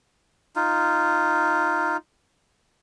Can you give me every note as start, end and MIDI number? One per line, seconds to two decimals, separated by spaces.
0.56 1.97 63
0.56 1.97 65